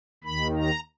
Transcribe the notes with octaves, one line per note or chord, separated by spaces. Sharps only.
D#2 D#3 B5
A#5